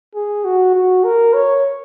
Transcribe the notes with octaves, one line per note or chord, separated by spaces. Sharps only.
G#4
F#4
F#4
A#4
C#5